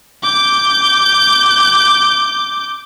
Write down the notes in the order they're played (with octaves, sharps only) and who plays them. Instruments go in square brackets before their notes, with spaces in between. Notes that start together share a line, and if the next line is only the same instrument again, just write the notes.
[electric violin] D6 G6